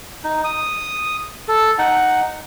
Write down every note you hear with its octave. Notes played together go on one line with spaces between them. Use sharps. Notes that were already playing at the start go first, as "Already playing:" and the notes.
D#4
D#6
A4
D#4 F#5